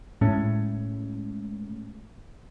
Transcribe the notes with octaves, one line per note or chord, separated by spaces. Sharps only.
A2 G#3 A3 C#4